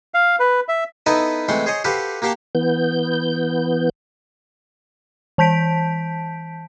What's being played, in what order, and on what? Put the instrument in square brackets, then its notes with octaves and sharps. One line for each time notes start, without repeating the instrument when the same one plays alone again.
[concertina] F5
B4
E5
[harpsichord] B3 D#4 E4 A4 B4 D#5
E3 G#3 A3 C4 F#5 C6
G#4 C5 C#5 D#5 G#5
F#4 G4 A4 B4 C5 F5
A#3 F#4 G4 F5 G5 A5
[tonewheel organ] E3 B3 G6
[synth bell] E3 A5 G6 B6 D7